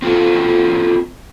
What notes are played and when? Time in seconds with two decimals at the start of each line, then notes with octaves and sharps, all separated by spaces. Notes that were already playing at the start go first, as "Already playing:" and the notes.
0.02 C4 F4 F#4 A4